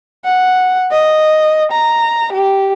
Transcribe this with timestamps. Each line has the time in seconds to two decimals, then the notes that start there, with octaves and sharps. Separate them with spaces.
0.25 F#5
0.92 D#5
1.72 A#5
2.33 G4